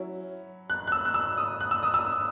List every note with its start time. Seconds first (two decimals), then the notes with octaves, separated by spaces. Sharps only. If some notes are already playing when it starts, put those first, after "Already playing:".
Already playing: F#3 C#4 E4
0.70 F#6
0.87 F#6
0.92 E6
1.05 F#6
1.14 E6
1.37 D#6
1.61 F#6
1.71 E6
1.83 D#6
1.94 E6